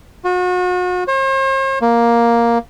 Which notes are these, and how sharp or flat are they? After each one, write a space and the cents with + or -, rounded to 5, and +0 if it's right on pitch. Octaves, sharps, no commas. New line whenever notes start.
F#4 -40
C5 +45
A#3 +5